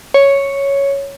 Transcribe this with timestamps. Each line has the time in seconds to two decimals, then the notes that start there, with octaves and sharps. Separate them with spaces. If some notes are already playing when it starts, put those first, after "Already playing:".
0.14 C#5